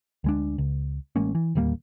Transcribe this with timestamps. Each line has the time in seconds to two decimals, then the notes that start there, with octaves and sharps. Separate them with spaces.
0.24 D2 G#3 D4
0.58 C#2
1.16 A1 G#3 A#3 C#4
1.35 E3
1.55 D1 D#2 G3 A#3